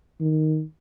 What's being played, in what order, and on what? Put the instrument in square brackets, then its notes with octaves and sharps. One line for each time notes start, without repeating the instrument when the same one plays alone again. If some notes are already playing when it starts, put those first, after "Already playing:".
[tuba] D#3